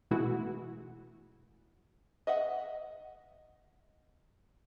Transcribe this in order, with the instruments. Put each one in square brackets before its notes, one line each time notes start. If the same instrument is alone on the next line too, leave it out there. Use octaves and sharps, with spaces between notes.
[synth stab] B2 E3 G#3 A3 E4 F#4
[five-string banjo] D#5 E5 F#5